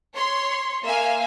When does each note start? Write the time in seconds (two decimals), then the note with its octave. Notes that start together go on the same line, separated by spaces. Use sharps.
0.15 C#5 C6
0.84 A#3 E5 F5 G#5